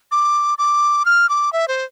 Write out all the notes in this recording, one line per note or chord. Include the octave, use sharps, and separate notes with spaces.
D6
D6
F6
D6
E5
C5